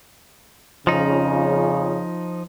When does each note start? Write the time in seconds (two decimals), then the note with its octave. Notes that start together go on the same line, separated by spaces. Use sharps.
0.87 F2 C#3 F3 D#4